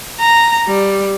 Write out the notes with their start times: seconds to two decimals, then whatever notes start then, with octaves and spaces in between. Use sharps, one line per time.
0.20 A#5
0.67 G3